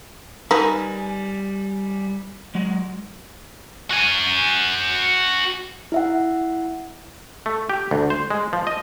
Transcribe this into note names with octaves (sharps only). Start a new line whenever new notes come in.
G3 D#4 A#4 B4 G#5
F#3 G#3
F#4 G#5
E4 E5 F#5
A3
G4
D2
C5
G#3
F3
D#5